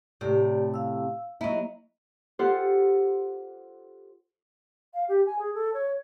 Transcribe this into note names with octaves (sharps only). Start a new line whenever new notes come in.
A2 C3 G4 D5
F5 E6
F#3 A#3 E4 D#5
F4 G4 A4 C5 F#5
F5
G4
G#5
G#4
A4
C#5